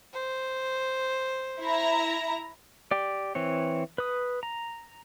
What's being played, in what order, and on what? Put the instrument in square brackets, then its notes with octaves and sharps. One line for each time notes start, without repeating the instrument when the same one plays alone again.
[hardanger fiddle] C5
[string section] E4 A#5
[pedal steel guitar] G4 D5
E3 C4 C#5
B4 D#6
A#5